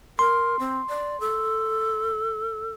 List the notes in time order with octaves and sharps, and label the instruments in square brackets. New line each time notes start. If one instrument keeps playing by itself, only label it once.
[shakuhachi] A#4 [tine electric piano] C6
[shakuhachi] C4
D5
A4